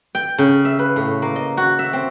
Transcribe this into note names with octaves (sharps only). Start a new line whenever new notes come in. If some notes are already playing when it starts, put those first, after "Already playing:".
G5
C#3
E5
B4
A2
A#3
D#5
F#4
E5
C4